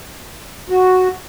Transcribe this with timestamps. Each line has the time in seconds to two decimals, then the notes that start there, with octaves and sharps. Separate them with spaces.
0.70 F#4